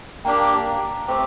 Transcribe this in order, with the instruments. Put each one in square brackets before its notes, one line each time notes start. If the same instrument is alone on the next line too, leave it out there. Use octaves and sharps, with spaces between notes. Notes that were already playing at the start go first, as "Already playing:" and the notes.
[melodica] A#3 D4 G4 [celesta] G5 A#5
[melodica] A3 C4 G4 [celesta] C5